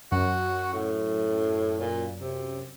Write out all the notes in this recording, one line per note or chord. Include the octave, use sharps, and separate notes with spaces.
F#2 F#4
A2
A#2
C3